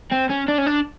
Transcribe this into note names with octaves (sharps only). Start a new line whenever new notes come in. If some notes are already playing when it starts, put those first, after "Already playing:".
C4
C#4
D4
C#4
D4